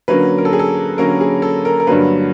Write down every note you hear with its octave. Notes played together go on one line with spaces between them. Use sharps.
D3 F#3 A#3 C#4 B4
A#4
A4
G#4
A4
D3 F#3 A#3 C#4 A#4
G#4
A4
A#4
A#4
G2 D3 F#3 A#3 B4